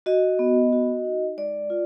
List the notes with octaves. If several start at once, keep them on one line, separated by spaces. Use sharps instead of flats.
F#4 D#5
B3
F#4
D#4
G#3 D5
F4